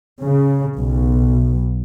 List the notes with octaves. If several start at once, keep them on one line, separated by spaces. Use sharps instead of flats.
C#3
B1